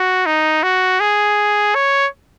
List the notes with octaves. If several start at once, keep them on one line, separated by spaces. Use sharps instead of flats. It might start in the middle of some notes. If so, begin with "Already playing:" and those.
Already playing: F#4
D#4
F#4
G#4
C#5